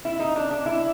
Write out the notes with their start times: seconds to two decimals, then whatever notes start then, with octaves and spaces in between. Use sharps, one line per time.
0.05 E4
0.20 D#4
0.36 D4
0.51 D4
0.66 E4